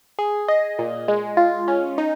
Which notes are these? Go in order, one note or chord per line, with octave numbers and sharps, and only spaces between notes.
G#4
D#5
A#2
G#3
F4
C#4
D#4